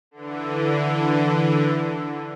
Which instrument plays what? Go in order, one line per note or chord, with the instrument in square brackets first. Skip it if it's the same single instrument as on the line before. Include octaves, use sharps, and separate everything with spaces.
[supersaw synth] D3 E3